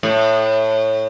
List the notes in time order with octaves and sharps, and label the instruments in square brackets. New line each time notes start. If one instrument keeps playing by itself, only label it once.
[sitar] A2